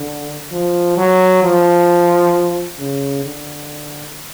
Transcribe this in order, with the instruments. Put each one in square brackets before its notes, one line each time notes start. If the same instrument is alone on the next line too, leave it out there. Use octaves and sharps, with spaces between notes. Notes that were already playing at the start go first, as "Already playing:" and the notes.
Already playing: [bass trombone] D3
F3
F#3
F3
C#3
D3